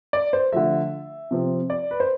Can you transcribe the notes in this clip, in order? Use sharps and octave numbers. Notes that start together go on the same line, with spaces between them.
D5
C5
D3 F3 A3 E5
C3 F3 C4
D5
B4
C5